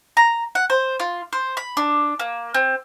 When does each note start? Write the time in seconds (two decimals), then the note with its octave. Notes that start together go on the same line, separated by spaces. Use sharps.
0.17 A#5
0.55 F#5
0.70 C5
1.00 F4
1.33 C5
1.57 B5
1.77 D4
2.19 A#3
2.54 C4